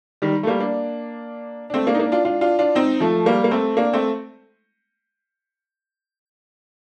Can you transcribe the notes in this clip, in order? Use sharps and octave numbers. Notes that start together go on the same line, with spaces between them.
D#3 G3
A3
G3 A#3
A#3 D4
D4
A3 C4
A#3 D4
D#4
A#3 D4
D4 F4
D4 F4
D4 F4
D4 F4
C4 D#4
F3 A3
G3 A#3
A#3
A3 C4
A#3 D4
A3 C4